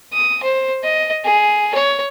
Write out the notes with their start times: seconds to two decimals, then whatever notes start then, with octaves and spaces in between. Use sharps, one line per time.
0.13 D#6
0.43 C5
0.83 D#5
1.24 G#4
1.75 C#5